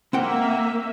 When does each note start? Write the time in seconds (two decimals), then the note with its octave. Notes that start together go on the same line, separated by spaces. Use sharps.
0.13 A#3 C4 E5 F#5 G5